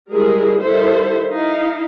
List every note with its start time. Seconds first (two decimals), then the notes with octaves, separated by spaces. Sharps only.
0.11 G3 G#3 E4 G#4 A#4
0.61 D#3 G3 E4 A4 C5 E5
1.31 D#4 E4 F5